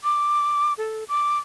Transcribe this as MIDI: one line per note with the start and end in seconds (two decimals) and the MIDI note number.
0.04 0.73 86
0.78 1.04 69
1.08 1.37 86